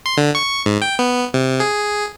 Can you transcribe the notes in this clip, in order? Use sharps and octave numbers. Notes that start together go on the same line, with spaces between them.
C6
D3
C#6
G#2
G5
B3
C3
G#4